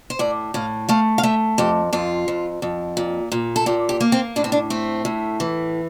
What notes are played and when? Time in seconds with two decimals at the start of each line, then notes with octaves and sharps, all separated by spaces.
0.10 C5
0.19 A2 D5
0.54 A2 F5
0.89 A3 F5
1.18 F5
1.23 A3 E5
1.58 F2 G4
1.93 F2 F4
2.28 F2
2.62 F2
2.97 A#2
3.32 A#2
3.56 A4
3.66 A#2 G4
3.89 G4
4.01 A#3
4.12 C4
4.36 A2 D4
4.44 C4
4.52 D4
4.70 A3 C4
5.05 A2
5.40 E3